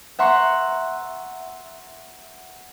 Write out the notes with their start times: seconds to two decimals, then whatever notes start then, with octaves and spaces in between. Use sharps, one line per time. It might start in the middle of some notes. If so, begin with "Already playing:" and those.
0.19 E5 F#5 A#5 C6 C#6